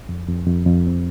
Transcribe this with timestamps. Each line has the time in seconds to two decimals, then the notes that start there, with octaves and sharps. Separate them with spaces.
0.09 F2
0.29 F2
0.47 F2
0.67 F2
0.87 C4